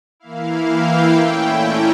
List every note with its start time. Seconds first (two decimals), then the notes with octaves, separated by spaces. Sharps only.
0.20 E3 A#3 E4 F5
0.67 G5
1.14 A#2 A3 C#4 E4
1.61 A#5